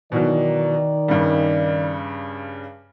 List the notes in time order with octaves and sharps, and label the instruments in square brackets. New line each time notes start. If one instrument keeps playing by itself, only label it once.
[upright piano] B2 E3 F#3 [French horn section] D#3 D5
[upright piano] G2 C#3 G3